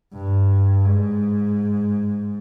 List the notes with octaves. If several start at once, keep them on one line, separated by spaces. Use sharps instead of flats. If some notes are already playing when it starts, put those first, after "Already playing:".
G2
G#2